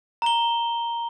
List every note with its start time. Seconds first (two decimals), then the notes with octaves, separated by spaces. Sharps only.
0.22 A#5 G7